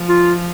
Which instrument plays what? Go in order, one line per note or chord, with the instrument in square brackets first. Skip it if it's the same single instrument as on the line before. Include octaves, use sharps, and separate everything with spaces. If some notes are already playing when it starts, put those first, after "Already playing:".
Already playing: [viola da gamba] F3
[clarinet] F4